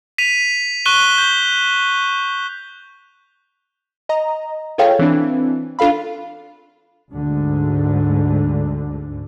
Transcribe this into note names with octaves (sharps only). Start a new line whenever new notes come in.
B6 D#7 F7
C#6 F#6 D#7 G7
G6
D#5 A#5
F4 G#4 A4 C#5 F5 G5
E3 C4 D4
D4 F4 A4 F5 B5
D2 G#2 D3